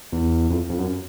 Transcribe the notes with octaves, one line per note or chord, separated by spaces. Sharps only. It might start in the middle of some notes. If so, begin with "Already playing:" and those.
E2
F2
F2
F#2